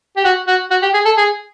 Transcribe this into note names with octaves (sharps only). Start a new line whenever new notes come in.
G4
F#4
F#4
F#4
G4
G#4
A4
G#4